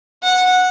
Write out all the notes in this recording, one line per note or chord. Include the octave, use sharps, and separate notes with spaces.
F#5